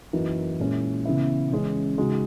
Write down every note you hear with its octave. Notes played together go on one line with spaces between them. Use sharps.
F#2 E3 A#3 D#4 F#4
A#2 G#3 C#4 E4
C#3 E3 B3 E4
C#3 E3 G#3 C#4
C#3 G#3 D#4 F#4